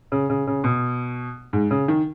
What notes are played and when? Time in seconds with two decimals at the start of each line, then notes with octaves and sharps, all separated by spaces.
0.12 C#3
0.30 C#3
0.47 C#3
0.64 B2
1.53 G#2
1.71 C#3
1.88 D#3